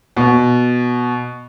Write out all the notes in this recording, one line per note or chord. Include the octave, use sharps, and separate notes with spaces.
B2